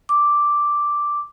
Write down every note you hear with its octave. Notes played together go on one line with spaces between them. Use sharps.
D6